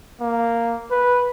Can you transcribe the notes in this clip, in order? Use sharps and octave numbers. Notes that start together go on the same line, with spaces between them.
A#3
B4